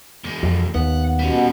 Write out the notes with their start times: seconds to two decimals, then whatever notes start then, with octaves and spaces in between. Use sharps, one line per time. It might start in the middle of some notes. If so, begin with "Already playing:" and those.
0.24 E2 G#3
0.43 F2
0.75 D#2 B3 F#5
1.19 B2 G3 C#4